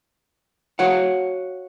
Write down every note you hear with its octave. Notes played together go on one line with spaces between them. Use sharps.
F#4 C#5 F5 F#5